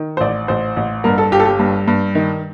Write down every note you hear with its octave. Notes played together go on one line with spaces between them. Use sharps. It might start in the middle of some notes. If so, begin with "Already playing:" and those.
Already playing: D#3
C5
A1 D5
A1 C5
A1
G2 A#4
A4
G1 G4
A4
G4
G2
G2
D#3